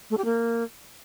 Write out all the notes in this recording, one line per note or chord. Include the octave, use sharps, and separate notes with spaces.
A3
G4
A#3